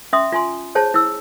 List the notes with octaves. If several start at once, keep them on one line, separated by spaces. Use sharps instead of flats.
C#4 E5 C6 D#6
F4 G#5 C6
G#4 C5 C#5 A5
E4 E6